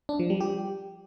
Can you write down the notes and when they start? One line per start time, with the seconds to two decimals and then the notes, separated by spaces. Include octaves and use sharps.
0.09 D4
0.19 F3
0.30 G3
0.40 G4